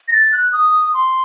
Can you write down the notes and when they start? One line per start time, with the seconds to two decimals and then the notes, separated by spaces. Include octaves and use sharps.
0.08 A#6
0.13 A6
0.33 F#6
0.53 D#6
0.94 C6